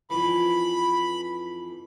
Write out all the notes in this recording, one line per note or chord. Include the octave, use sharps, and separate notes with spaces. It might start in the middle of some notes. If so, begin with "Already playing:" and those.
F2 E3 B5